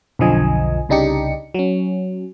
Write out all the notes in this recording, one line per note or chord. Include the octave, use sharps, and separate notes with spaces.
B1 F2 D3 F3 D#5 G#5
C2 C#3 D4 D#4 G4 C#7
F#3 C#4